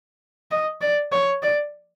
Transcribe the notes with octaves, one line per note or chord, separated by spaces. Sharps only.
D#5
D5
C#5
D5